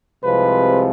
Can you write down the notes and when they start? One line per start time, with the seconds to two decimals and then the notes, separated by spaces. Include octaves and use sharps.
0.23 C2 C3 F3 G#3 B4